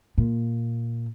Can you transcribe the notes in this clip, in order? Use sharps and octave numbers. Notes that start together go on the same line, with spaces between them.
A#2